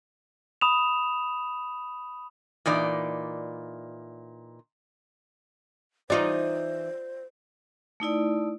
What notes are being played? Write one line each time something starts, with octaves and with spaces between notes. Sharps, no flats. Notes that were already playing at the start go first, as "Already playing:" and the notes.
B5 D#6 E7 F7
A#2 E3 D#4 D5
E3 D#4 F4 C5 D5
A3 D#4 E4 D5